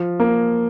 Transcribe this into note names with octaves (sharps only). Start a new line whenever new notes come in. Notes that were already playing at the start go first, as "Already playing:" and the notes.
Already playing: F3
A#3